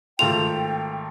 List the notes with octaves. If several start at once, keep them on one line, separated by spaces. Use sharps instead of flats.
G#1 A3 F4 G5 F7